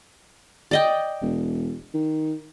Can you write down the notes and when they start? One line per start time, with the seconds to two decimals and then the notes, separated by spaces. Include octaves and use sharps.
0.71 D5 D#5 G5
1.22 E1
1.94 D#3